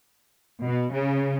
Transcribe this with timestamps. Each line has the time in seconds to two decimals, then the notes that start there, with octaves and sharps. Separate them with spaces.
0.63 B2
0.93 C#3